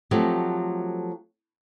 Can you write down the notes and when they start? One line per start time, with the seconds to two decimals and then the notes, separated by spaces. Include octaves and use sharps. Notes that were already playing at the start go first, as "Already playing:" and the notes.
0.11 F3 F#3 A3 C4 F#4 G4